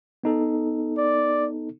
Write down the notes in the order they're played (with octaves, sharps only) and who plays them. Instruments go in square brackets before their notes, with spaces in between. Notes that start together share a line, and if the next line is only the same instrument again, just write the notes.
[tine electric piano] B3 D#4 A4
[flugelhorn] D5